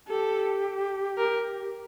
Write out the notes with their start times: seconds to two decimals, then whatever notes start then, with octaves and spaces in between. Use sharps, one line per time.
0.08 G4 A4
1.18 A#4